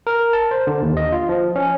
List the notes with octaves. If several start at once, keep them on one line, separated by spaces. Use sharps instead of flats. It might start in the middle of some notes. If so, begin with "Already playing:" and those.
A#4
A5
C5
D3
D#2
D#5
F4
F3
C#4